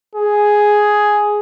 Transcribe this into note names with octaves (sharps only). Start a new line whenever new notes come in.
G#4